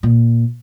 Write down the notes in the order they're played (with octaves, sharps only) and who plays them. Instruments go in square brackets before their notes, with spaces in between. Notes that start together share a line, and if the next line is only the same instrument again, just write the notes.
[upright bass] A#2